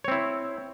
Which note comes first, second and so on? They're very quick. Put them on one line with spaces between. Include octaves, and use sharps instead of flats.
C#5 C4 E4